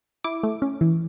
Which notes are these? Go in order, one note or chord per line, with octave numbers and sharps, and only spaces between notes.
E4 D6
A3
C#4
E3